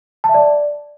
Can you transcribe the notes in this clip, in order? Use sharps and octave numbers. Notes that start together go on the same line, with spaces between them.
A5
E5
D5